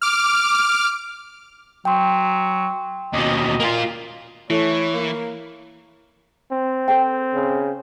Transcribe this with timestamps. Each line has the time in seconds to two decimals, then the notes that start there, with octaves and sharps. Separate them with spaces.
0.02 D6 F6
1.85 F#3 G5 C6
3.13 D#2 B2 D#5
3.60 A#3 F4
4.50 E3 A3 E4 C#5
4.93 A#3
6.52 C4
6.88 A4 C5 G5
7.34 C#3